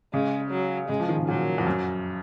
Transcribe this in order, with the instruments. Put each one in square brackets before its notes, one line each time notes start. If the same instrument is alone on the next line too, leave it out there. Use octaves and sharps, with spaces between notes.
[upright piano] C#3 [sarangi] G#3
[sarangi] F#3
[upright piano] C#3 [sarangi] G#3
[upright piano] F3
D#3
C#3
[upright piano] A#2 [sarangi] F#3
[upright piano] F2
F#2